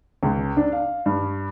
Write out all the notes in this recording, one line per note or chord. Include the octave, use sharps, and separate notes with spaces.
C#2
D4
F5
G2